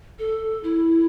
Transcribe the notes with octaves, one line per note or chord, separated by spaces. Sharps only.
A4
E4